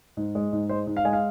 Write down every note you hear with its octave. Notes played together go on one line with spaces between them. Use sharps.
G#2
G#3
G#2
G#3 C5
G#2
F5
G#3 G#5
F5